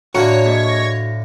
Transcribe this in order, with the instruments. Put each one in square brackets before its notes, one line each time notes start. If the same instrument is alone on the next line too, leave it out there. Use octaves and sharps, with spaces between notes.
[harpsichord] A2 D3 F4 [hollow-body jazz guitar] F#4 [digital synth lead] C#5 [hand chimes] D5 A#5
[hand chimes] A#3 G#4 D#5
A#6